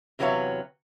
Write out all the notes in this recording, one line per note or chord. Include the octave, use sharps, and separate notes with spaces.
E2 C3 F#3 B4 C#5 F5